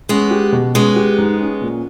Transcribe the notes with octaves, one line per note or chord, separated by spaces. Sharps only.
G#3 B3 C#4
G4
B2
G#3 B3 C#4
G4
G#2
C#4
A#2